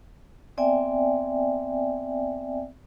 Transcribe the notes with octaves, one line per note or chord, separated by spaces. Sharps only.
B3 C4 D5 E5 G5 G#5